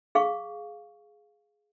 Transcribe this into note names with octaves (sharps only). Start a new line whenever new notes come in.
G#4 F5 C#6